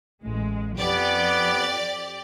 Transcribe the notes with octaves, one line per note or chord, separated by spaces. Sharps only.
A1 G#3
F2 F3 B3 G4 D5